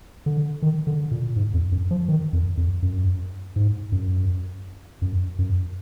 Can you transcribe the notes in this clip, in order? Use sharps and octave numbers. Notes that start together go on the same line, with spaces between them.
D3
D#3
D3
A#2
G#2
F2
F#2
F3
D#3
F2
F2
F#2
G#2
F#2
F#2
F#2